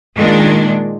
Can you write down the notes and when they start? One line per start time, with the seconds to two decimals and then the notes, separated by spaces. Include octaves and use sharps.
0.16 A#2 D#3 G#3 D4